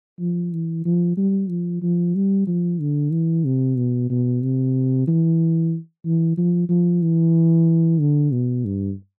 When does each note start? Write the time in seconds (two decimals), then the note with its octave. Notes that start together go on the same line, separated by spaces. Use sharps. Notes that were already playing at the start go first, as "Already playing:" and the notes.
0.20 F3
0.53 E3
0.85 F3
1.17 G3
1.49 F3
1.82 F3
2.15 G3
2.47 F3
2.80 D3
3.12 E3
3.45 C3
3.77 B2
4.10 B2
4.42 C3
5.08 E3
6.05 E3
6.38 F3
6.69 F3
7.02 E3
8.00 D3
8.33 B2
8.65 G2